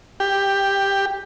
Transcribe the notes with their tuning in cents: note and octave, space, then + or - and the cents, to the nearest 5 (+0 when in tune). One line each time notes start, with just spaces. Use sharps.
G4 +10